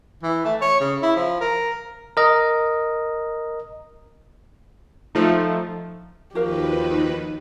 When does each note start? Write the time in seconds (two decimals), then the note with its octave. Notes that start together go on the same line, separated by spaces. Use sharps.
0.23 E3
0.45 A3
0.61 C#5
0.81 C#3
1.02 E4
1.16 F3
1.41 A#4
2.17 A#4 D#5
5.15 F3 A3 D#4
6.35 D#2 D#3 F3 F#4 G4 A#4 B4 F5